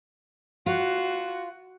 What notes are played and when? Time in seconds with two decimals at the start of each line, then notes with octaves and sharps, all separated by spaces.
0.66 F4 F#4